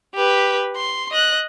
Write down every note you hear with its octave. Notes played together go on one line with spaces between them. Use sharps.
G4 B4
C6
D#5 F#6